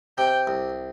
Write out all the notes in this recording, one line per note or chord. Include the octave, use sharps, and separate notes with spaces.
C3 G5
C2